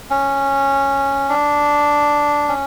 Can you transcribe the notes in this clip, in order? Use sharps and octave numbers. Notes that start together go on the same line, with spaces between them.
C#4
D4
C#4